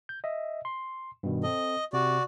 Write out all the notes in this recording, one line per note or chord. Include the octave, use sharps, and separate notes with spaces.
G6
D#5 E5
C6
G2 B2 D#3
C4 A4 D#5
C3 F#4 D5